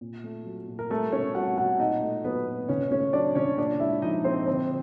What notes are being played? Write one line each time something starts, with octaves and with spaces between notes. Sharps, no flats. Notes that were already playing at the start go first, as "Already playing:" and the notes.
A#2
A3
F#3
A#2
A#4
G3 A3 A4
B2 C#4 C#5
G3 F#4 F#5
B2 F#4 F#5
A#2 D#4 D#5
A3
F#3 B3 B4
A#2
C#3 C#4 C#5
A3 C#4 C#5
F#3 D4 D5
C#3 C#4 C#5
A#2 D4 D5
G#3 E4 E5
F3 D#4 D#5
A#2 C4 C5
D3 C4 C5